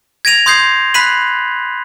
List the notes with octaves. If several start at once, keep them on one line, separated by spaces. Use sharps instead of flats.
G#6 A#6 D7 D#7 F7
C6 D#6 G6 G#6 C7
B5 F#6 B6 C7 D#7 F#7